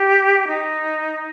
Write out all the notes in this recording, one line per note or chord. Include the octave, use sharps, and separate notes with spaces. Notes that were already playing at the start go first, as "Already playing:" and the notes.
Already playing: G4
D#4